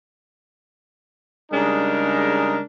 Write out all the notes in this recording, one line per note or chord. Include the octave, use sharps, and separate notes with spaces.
C#3 G3 G#3 D4 D#4 A#4